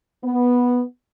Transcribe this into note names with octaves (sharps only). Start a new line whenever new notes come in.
B3